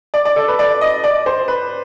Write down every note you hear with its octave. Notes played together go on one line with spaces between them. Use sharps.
D5
D5
A4
B4
D5
D#5
D5
C5
B4